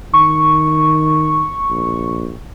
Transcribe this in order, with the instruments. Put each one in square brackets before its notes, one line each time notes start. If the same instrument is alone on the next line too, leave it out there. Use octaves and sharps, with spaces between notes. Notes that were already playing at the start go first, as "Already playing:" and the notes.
[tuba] D#3 [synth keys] C#6
[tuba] A#1